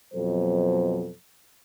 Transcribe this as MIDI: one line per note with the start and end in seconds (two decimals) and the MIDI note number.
0.14 1.10 41
0.14 1.10 47
0.14 1.10 54
0.14 1.10 69
0.14 1.10 72